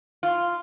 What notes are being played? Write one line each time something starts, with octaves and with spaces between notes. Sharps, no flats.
F4